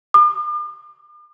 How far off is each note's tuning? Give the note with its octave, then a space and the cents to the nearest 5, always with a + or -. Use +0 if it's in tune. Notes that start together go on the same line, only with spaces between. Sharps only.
D6 +45